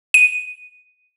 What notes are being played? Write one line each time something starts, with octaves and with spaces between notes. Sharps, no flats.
D#7